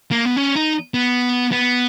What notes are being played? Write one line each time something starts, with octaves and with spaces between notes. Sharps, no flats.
A#3
B3
C#4
D#4
B3
B3